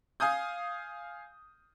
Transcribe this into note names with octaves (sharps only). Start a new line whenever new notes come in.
F5 G#5 D#6 G6